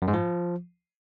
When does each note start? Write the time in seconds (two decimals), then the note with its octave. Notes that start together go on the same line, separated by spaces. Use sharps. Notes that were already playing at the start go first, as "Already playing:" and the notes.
0.02 F#2
0.08 G#2
0.14 F3